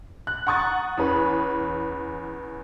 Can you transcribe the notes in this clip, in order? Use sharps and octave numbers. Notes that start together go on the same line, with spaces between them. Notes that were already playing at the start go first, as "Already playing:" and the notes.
F#6
F#5 A#5 C#6 D#6 F#6 A6
E2 C#4 B4